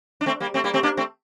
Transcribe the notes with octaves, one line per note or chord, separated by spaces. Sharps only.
D4
A3 C4
G3 A#3
A3 C4
G3 A#3
A3 C4
A#3 D4
A3 C4